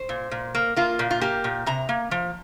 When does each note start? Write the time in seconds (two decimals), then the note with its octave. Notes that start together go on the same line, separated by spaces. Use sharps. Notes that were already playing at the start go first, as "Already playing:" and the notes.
Already playing: C5
0.09 A#2
0.31 A#2
0.55 A#3
0.76 A#3 F4
0.99 A#2
1.10 F4
1.21 A#3 G4
1.44 A#2
1.66 C3 A#5
1.89 A#3
2.11 F3